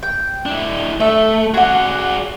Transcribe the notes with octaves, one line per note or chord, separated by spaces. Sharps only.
G5
D4 E4
A3 E5
F#4 G#4 D5 F#5